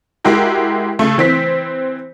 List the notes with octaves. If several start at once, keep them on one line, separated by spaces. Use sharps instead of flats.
G#3 E4 F#4 G4 A#4
C#3 A3
E3 C4 B6